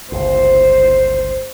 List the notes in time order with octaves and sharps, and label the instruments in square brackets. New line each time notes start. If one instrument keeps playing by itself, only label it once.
[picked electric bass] G1 C#2 [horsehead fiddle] C5